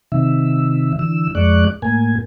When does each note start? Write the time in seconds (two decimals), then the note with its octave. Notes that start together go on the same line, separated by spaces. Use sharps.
0.12 C3 D#3 E5
0.99 D3 E3 E6
1.35 F2 G#3 D5 C#6 D6 F#6
1.82 A2 A#3 G#5